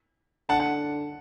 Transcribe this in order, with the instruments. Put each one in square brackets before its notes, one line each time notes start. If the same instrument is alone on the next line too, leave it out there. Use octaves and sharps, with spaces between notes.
[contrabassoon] D3 [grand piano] F#5 A5
[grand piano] F#5